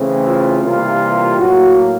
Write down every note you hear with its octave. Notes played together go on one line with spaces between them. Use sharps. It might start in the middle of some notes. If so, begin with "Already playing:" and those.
Already playing: C#3 E3 A3 C4
F4
C3 E3 G3 A#3 F4
A2 F#3 A#3 F#4